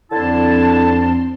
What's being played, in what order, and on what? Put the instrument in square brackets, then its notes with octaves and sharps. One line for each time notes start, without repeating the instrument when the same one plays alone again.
[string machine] F2 C4 C6 [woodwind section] D3 E4 A5